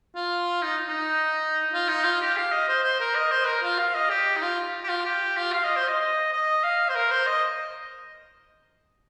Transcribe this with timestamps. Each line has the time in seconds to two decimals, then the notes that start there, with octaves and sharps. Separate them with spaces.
0.15 F4
0.62 D#4
0.88 D#4
1.73 F4
1.88 D#4
2.04 F4
2.21 G4
2.37 F5
2.52 D#5
2.68 C5
2.83 C5
3.00 A#4
3.15 D#5
3.31 C5
3.47 A#4
3.63 F4
3.78 F5
3.95 D#5
4.10 G4
4.36 D#4
4.42 F4
4.84 G4
4.89 F4
5.05 G4
5.37 F4
5.53 F5
5.64 D#5
5.76 C5
5.87 D#5
6.01 D#5
6.32 D#5
6.64 F5
6.89 C5
6.95 A#4
7.11 C5
7.27 D#5